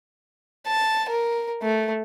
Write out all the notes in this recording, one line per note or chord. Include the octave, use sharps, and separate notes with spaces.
A5
A#4
A3